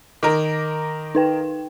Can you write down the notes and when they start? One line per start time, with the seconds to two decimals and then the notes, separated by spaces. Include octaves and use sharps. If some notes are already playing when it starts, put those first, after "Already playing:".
0.23 D#3 A#4 D6
1.15 D#4 B4 G5